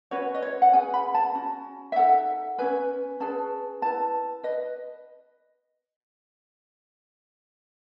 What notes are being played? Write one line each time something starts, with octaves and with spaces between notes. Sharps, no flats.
C#4 F#4 B4 C#5
D#5
C#5
F#5
C#4 G#4 B4 G#5
B5
A5
C#4 F#4
E5
D#4 A4 F#5
C#4 G#4 B4 G#5
C#4 G#4 B4 A5
E4 B4 A5
B4 D#5